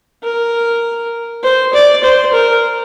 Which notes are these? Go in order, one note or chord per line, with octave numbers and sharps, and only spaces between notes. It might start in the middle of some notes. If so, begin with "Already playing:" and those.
A#4
C5
D5
C5
A#4